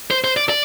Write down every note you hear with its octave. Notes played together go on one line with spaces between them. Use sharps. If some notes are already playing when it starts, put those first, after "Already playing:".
C5
C5
D5
D5